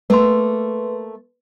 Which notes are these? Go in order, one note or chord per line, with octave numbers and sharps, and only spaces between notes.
A3 A#3 B4 C6